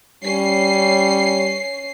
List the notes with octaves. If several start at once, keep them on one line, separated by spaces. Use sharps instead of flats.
G3 C#4 C7